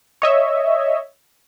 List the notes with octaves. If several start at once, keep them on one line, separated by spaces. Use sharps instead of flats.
C#5 D#5 E5